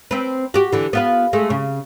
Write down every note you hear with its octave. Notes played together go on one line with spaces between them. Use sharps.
C4 B4
F#4 G4
D3 E3
B3 F4 B4
G#3 A3
C#3